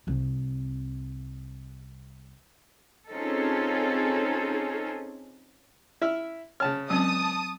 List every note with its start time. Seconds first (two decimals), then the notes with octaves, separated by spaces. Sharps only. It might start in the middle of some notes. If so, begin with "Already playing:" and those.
0.07 C2 C4
3.11 C4 C#4 D#4 F4 G#4 A4
6.01 E4 E5 F6
6.60 C#3 C#5 A5 F6
6.90 C#2 F#3 C4 A5 D#6